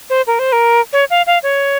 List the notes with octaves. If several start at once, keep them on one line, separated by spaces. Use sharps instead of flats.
C5
A#4
C5
A#4
C#5
F5
F5
C#5